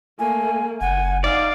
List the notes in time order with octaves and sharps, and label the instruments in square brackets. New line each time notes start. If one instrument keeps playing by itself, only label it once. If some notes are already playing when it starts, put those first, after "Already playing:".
[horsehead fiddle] A3 A#3 [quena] G#5
[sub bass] F#1 [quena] F#5 [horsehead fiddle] G#5
[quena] D#4 [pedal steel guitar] D5 [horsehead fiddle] F5